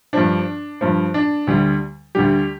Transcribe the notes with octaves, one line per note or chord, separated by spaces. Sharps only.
G2 F3 D4
G2 F3
D4
D2 D3 G3
D2 D3 G3 G4